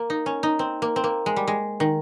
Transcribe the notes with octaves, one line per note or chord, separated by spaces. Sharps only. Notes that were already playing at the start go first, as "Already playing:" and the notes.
Already playing: A#3
D#4
C#4
D#4
C4
A#3
C4
A#3
G#3
G3
G#3
D#3